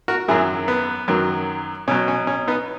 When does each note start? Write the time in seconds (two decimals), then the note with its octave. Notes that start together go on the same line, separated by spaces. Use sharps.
0.08 F#4 A#4
0.28 F#2 D#3 F#3 E4 G#4
0.68 B3
1.08 F#2 D#3 F#3
1.88 B2 C#4
1.91 F#3
2.08 C#4
2.27 C#4
2.48 B3 D#4